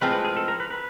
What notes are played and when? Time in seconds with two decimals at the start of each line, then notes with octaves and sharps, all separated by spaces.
0.01 A2 F3 G#3 C4 F4 B4
0.13 B4
0.25 G#4
0.37 A4
0.48 A#4
0.60 B4
0.71 B4